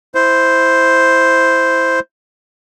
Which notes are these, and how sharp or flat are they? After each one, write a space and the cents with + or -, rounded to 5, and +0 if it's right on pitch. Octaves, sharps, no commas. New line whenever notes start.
E4 +0 C5 +0